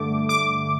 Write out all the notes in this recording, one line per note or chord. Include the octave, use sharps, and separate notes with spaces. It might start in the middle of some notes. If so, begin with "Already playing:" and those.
Already playing: G2 D3 A3 D6
D6